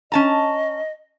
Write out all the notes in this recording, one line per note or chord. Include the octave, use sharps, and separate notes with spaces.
C#4 D#5 A5 A#5